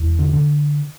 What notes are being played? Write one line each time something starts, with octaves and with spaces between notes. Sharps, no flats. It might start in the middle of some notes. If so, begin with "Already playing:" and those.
Already playing: E1 E2
D3
D3